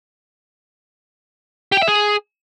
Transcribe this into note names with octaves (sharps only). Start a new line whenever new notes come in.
G4
G5
E5
G#4